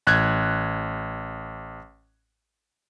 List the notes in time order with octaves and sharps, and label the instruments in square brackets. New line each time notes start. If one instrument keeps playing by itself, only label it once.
[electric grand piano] A1 F#6 G#6